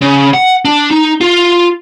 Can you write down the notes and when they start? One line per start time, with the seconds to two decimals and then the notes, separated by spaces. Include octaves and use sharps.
0.01 C#3
0.34 F#5
0.65 D4
0.91 D#4
1.21 F4